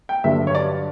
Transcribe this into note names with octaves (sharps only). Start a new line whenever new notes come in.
G5
G2 D3 F#3 E5
C#5
D5